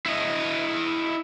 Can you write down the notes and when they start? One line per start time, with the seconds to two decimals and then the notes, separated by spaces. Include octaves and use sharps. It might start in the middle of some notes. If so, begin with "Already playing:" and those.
0.06 E4 D#5